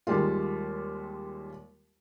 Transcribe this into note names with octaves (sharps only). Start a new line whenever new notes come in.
D#2 D#3 G3 G#3 F4